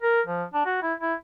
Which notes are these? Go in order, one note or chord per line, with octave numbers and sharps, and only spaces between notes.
A#4
F3
D4
F#4
E4
E4